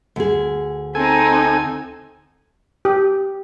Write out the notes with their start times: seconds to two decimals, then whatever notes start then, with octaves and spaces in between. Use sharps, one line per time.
0.16 D2 G#4
0.95 C4 D#4 A4 G#5
2.85 G4